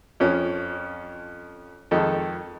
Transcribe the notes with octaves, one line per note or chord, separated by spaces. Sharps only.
F2 F3 C#4
F2 D#3 G#3 A4